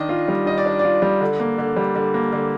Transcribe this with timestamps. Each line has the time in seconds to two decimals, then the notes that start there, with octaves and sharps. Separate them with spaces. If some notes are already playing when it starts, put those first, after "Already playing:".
Already playing: D#3 D4 D#5
0.09 F4
0.28 G3
0.46 D#3 D#5
0.58 D5
0.66 D4
0.79 F4 D5
1.02 G3
1.21 D3
1.40 A#3
1.58 D3
1.76 G3
1.95 D3
2.14 A#3
2.32 D3